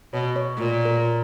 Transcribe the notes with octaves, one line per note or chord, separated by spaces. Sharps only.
B2 C#5
C#5
A#2
A#4